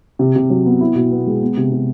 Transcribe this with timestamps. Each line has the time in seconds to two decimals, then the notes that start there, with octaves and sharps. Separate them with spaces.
0.19 C3
0.36 C3
0.50 F#3
0.66 B3
0.81 E4
0.95 B2
1.11 B3
1.27 G#3
1.42 B3
1.57 C3
1.72 C3